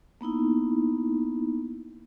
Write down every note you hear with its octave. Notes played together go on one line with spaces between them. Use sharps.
A#3 B3 D#4 E4